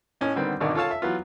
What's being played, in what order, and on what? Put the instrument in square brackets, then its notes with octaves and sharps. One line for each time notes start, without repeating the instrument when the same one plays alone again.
[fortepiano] A2 C#4 D#4
D3 D#3 G3 B3 C4
G#1 B2 D3 D#3 D4 D#4
F4 A4 C#5 F5 A5
E5
E3 F#3 B3 F4